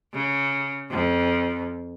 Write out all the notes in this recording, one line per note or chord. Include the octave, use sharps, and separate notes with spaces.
C#3
F2